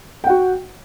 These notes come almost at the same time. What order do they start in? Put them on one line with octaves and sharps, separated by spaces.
G5 F#5 F#4